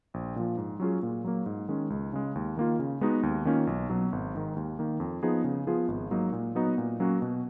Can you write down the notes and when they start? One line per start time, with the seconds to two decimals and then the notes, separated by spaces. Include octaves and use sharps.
0.14 A#1
0.36 A#2 F3
0.57 G#2
0.80 F#3 C#4 F4 G#4
1.03 A#2
1.24 F#3 A#3
1.46 G#2
1.69 D#3 G#3 C#4
1.90 C#2
2.13 C#3 G#3
2.35 D#2
2.57 D#3 A#3 F4
2.79 C#3
3.01 G#3 B3 D#4 F#4
3.23 D#2
3.45 D#3 A#3 C#4 F4
3.67 B1
3.90 B2 F#3
4.12 G#1
4.35 G#2 D#3
4.56 D#2
4.79 D#3 A#3
5.00 F2
5.23 F3 B3 D#4 G#4
5.44 C#3
5.67 F3 B3 F4 G#4
5.88 G#1
6.11 G#2 F#3 A#3 D#4
6.33 A#2
6.55 F#3 B3 D#4 F#4
6.78 A#2
7.00 F#3 A#3 C#4 F#4
7.22 B2